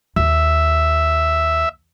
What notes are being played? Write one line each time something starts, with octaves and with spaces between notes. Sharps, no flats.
D#2 E5